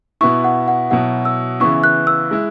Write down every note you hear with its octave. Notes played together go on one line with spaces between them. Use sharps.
B2 B3 E4 C#6
F#5
F#5
B2 F#3 E4 F#5
E6
C#3 E3 B3 E4 C#6
F#6
E6
G#3 E4